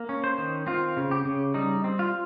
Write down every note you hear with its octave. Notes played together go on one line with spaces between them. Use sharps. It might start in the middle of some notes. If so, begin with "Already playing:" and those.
Already playing: A#3
C#4
C5
D#3
C4 F4
C#3
G4
C#3
G3 D#4
C4
F4